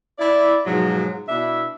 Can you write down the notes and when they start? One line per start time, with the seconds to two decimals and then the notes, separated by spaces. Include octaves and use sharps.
0.18 E4 D5
0.66 G#2 B2 F3 F#3
1.29 B2 D4 E4 E5